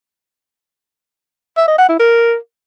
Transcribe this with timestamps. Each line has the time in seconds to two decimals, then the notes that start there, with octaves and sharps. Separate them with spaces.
1.57 E5
1.68 D#5
1.78 F#5
1.89 E4
1.99 A#4